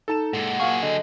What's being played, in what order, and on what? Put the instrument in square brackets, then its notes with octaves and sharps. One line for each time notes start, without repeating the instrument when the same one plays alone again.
[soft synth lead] D#4 [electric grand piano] A4 A5 E7
[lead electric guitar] A#2 G#3 [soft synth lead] F#5
[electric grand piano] A#2 F5 C#6 [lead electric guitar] F#3 G#4
[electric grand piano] D3 [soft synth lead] D#5